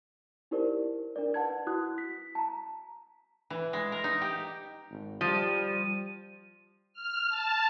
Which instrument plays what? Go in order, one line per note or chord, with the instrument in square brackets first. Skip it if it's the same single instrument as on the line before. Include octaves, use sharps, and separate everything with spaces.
[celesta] D#4 E4 G4 A#4 C5 D5
D4 A#4 D5
B4 F#5 A5 G#6
E4 F#4 D#6 F#6
B6
A5 A#5
[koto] E3
G#3
A#4
D#4
G4
[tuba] G#1
[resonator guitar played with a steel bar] F3 [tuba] G3 [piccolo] D#7
[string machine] F6
A5